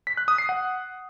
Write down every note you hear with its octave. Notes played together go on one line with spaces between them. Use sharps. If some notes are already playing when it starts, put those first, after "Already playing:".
B6
F#6
D#6
C7
F#5